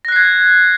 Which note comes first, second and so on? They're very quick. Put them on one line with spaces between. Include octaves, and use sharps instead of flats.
A#6 F#6 C7 G#6